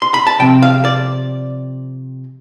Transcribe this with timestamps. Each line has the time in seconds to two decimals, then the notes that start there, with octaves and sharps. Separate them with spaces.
0.02 C6
0.14 B5
0.27 A5
0.39 C3 F3 C4 G5
0.62 F5
0.85 D5